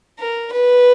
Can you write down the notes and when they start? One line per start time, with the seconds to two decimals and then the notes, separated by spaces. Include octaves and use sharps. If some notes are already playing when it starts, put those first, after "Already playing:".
0.20 A#4
0.52 B4